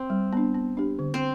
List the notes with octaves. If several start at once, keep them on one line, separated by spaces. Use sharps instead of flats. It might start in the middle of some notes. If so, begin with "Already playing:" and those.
Already playing: C4
G3
B3 D4
B3
D4 G4
D3
C4